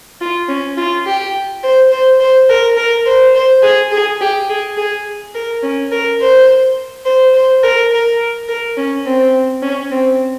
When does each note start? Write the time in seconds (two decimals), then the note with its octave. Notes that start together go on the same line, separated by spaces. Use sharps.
0.21 F4
0.49 C#4
0.77 F4
1.06 G4
1.63 C5
1.91 C5
2.20 C5
2.49 A#4
2.77 A#4
3.06 C5
3.35 C5
3.62 G#4
3.92 G#4
4.21 G4
4.49 G#4
4.77 G#4
5.35 A#4
5.63 C#4
5.91 A#4
6.21 C5
7.05 C5
7.34 C5
7.63 A#4
7.91 A#4
8.49 A#4
8.77 C#4
9.06 C4
9.62 C#4
9.91 C4